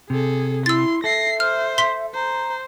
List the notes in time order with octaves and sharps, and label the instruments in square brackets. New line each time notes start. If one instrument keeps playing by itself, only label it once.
[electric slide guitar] C3 [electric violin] G#4 A4
[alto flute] E4 [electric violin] C6 [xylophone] E6 A6
[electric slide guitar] A4 [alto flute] E5 [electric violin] A#6 C7
[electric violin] C5 [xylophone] F6
[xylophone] C6 B6
[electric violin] C5 [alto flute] A#5